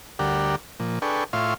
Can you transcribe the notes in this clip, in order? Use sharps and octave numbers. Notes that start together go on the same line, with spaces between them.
D2 G3 G4 A#4 D5 F#5
A#2 F3
D4 G#4 A4 B4 G5 C#6
A2 F4 C#5 E5 F5 C6